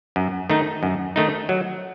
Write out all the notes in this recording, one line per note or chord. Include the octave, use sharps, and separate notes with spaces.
F#2
D#3 A3 D#4
F#2
D#3 A3 D#4
F#3